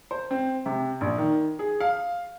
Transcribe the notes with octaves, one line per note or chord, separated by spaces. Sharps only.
C5
C4
C3
A#1
D#3
G#4
F5